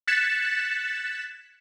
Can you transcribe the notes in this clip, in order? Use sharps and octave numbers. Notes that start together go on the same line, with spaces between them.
F#6 G#6 A6 B6 C#7 E7